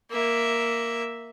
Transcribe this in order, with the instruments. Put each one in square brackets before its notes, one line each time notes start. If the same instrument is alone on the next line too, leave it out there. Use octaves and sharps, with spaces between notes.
[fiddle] A#3 E5